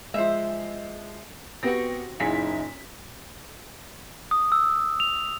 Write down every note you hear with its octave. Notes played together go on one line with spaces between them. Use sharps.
F3 G#3 C5 E5
B3 C4 F#4 G4 A#6
F#1 A#2 D#4 E4 G#4 B6
D#6
E6
F7